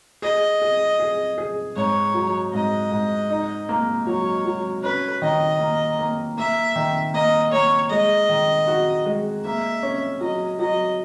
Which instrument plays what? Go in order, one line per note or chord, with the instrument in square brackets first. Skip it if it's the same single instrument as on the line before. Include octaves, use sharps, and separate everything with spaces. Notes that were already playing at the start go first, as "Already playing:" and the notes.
[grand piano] G#4 [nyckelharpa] D#5
[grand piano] G#4
G#4
G#4
[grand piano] G#2 [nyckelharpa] C#5
[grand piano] F#3
[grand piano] G#2 [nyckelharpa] D#5
[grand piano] G#2
D#4
A#3
[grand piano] F#3 [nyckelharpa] C#5
[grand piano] F#3
[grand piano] C#4 [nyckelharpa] B4
[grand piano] D#3 [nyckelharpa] D#5
[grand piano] A#3
A#3
[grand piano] A#3 [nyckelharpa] E5
[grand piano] D#3
[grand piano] A#3 [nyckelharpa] D#5
[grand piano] A#3 [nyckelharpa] C#5
[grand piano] G#3 [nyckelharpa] D#5
[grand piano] D#3
F#4
G#3
[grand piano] A#3 [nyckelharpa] E5
[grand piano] C#4
[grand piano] F#3 [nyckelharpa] D#5
[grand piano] F#3 [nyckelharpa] D#5